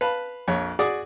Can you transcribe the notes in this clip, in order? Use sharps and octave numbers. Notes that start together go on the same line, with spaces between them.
B4 F5 A5
A#1 F2 C#5
F#4 G#4 D5 D6 D#6